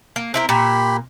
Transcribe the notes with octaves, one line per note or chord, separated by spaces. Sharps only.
A#3
C4 E4 A#4
A#2 G4 B5